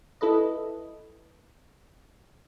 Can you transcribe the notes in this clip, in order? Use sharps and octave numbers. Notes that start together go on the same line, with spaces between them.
E4 A4 B4 D#5